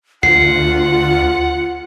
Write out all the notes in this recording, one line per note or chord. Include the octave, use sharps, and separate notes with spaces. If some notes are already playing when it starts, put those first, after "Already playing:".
D2 F4 F#5 C7